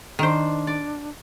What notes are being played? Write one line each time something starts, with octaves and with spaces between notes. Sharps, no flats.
D#3 D4 C5
D5